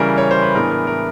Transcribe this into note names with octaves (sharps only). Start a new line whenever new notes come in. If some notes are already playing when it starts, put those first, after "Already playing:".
Already playing: C#3 E3 G3 A#4
C#5
C5
B4
A2 E3 G#3 B3 D4 A#4
A#4
A#4